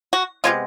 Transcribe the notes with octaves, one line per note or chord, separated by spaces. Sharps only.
F#4
C3 E3 G#3 B3 F4